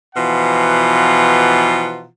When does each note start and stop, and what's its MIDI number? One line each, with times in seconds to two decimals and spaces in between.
0.16 2.06 47
0.16 2.06 52
0.16 2.06 53
0.16 2.06 65
0.16 2.06 78
0.16 2.06 82